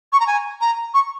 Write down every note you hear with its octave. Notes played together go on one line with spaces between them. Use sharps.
C#6
A#5
G#5
A#5
C#6